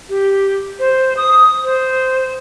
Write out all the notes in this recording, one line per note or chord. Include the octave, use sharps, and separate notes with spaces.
G4
C5
D#6
C5